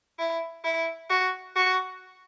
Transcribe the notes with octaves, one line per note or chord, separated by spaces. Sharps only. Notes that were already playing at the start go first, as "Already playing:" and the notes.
E4
E4
F#4
F#4